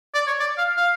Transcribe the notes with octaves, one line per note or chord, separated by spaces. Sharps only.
D5
C#5
D5
F5
F5